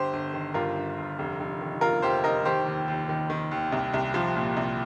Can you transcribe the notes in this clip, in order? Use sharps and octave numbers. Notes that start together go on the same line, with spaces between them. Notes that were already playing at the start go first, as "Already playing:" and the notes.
Already playing: G1 G4 C5
G1
D#3
G2 F4 A#4
G1
G1
F1
F1
D#3
D#2 F4 A#4
F1 G4 C5
F1 A#4 D#5
D#3 G4 C5
D#2
D#2
D#3
D#3
D#2
C2
C2
F3
A#2
C2